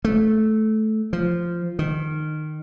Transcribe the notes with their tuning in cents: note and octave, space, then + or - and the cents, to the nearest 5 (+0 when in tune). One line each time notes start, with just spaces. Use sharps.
A3 -15
F3 -10
D#3 -20